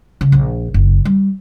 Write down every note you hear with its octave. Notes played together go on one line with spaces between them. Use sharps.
C#3
A#1
F#1
G3